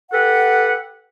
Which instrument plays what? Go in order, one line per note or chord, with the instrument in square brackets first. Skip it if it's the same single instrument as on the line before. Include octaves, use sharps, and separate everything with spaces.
[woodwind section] G4 A4 B4 F#5